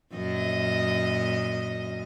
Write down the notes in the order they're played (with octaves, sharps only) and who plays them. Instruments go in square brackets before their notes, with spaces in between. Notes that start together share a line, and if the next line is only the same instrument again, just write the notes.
[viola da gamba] F#2 A#2 D#5